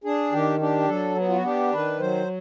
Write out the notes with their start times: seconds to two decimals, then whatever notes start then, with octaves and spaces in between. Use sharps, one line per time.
0.04 D4 G#4
0.32 D#3 G4
0.60 D4 G4
0.88 F#3 A4
1.16 B3
1.28 F4
1.35 F#4
1.44 D4 G4
1.72 D#3 B4
1.99 F#3 C5